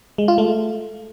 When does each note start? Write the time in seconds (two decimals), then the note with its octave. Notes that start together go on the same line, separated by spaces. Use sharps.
0.18 G#3
0.28 F4
0.38 A3